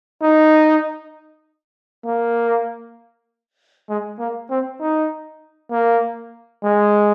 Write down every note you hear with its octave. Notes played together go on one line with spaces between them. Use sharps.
D#4
A#3
G#3
A#3
C4
D#4
A#3
G#3